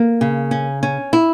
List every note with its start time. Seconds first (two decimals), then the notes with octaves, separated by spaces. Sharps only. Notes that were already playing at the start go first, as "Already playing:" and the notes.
Already playing: A#3
0.21 C#3
0.51 C#4
0.83 C#4
1.13 E4